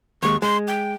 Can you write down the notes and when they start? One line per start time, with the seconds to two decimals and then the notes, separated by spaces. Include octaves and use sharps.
0.23 D#2 G#3 C#6
0.42 G#3 C6
0.68 G5